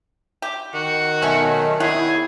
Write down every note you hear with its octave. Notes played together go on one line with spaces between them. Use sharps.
G4
D#3 F#4
B1 A3 C#4 F#5
E4 G4 G#4 C#5 F#5